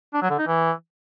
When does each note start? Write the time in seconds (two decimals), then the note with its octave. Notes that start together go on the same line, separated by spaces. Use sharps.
0.14 D4
0.22 F#3
0.30 D3
0.38 D#4
0.47 E3